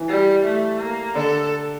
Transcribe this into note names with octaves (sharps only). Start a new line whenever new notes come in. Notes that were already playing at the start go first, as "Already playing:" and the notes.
Already playing: E3
G3
A3
A#3
D3 A4